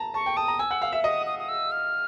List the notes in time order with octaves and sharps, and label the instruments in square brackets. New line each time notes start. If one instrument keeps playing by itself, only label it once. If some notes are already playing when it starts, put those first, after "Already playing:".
Already playing: [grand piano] A5 A#5
[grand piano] A5 [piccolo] C#6
[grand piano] G5
[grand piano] A5 [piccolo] D#6
[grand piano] A#5
[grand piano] G#5 [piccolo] E6
[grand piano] F#5
F5
E5
[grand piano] D#5 [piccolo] D#6
[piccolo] D#6
D#6
E6
F6